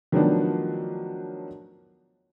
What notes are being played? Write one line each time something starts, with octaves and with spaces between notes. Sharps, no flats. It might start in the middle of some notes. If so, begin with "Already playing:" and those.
D#3 F3 F#3 A3 B3 D4